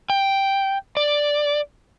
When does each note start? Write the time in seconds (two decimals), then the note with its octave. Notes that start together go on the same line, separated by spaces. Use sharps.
0.10 G5
0.97 D5